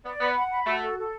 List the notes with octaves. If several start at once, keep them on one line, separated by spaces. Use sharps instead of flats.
B3 D5
B3 B5
F#5
B5
A3 F#4
A4
A4